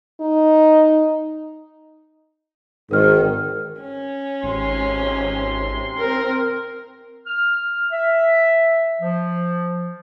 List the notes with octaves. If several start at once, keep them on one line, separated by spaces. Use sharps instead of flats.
D#4
G#1 G#2 D#3 A#4 F6
C#4
G#1 C3 C6
C4 A#4
F6
E5
F3